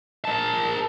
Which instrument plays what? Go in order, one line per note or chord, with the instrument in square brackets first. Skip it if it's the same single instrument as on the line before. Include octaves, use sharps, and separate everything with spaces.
[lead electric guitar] A#4 A5